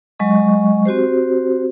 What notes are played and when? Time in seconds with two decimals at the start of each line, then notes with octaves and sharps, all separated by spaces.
0.19 F#3 G#3 D#5 C#6
0.86 C4 F#4 G4 C5